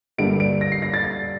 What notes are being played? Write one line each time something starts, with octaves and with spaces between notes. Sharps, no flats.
G2 D3 G3 A#3 D7
D7
A#6
C7
A#6
A6
A6